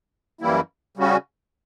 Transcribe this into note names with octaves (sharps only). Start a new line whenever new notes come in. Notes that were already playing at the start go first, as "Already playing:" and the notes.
F#2 E3 G3 A#3 E4
C#3 G3 C#4 F#4